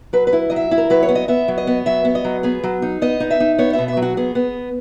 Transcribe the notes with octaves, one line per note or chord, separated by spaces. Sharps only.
F#3 B4
B4
E4
F#3 D#5
E5
E4
A#4
F#3 B4
C#5
B3
D#5
B3 E5
F#3
D#5
B3
F#3 E5
B3
D#5
F#3
B3 G#4
F#3
D#4
B3 D#5
D#4
E5
D#4
B3 C#5
E5
B2
E5
F#3
F#4
B3 G#4
B3